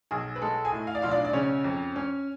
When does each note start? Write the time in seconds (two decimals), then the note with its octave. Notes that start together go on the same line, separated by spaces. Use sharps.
0.11 B1 G#4
0.36 B4
0.42 G#3 A4
0.65 G#4 G#5
0.72 A2
0.87 F5
0.95 D5
1.02 B1 F4 F5
1.11 D4 D5
1.25 D5
1.33 C#3 C#4 C#5
1.64 F2
1.96 C#4